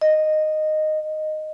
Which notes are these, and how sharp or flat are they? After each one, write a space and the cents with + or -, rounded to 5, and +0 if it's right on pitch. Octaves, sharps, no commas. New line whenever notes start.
D#5 -10